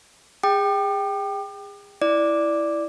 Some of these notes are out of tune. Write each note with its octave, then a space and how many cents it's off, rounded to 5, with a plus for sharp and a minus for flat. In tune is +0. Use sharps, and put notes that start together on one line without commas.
G#4 -35 G5 +0 D6 +40
E4 +0 D5 +0 D6 +0